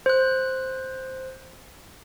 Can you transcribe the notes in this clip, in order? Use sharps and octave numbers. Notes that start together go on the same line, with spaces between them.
C5 F#6